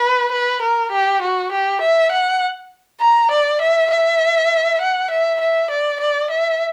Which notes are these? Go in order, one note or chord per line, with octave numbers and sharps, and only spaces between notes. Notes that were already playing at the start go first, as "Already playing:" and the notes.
Already playing: B4
B4
A#4
G4
F#4
G4
E5
F#5
A#5
D5
E5
E5
F#5
E5
E5
D5
D5
E5